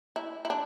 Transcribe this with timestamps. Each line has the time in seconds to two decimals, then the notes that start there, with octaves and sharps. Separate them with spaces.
0.16 E4
0.45 E4
0.50 D4